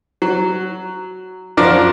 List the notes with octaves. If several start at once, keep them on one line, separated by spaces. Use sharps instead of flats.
F#3
F#2 F3 D4 A#4 D6